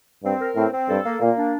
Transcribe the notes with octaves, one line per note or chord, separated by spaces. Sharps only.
G2 C4
A#4
A2 C4
C4
G2 A4
A#3
A#2 A#3
D4